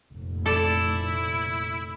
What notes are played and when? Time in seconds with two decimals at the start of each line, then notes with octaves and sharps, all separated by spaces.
0.12 F1 A#2
0.46 E4 A4 D5